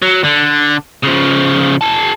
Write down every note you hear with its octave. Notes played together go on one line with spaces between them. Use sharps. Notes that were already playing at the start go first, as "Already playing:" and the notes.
F#3
D3
C#3 F3
G#4 A5